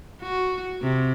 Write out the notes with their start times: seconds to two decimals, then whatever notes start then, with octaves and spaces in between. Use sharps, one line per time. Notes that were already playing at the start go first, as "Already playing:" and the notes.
0.22 F#4
0.82 C3